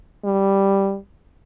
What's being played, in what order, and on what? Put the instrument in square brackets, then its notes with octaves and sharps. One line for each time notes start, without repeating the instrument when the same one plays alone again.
[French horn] G3